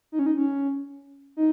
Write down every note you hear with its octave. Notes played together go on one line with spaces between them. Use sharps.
D#4
C#4
D#4
C#4
D#4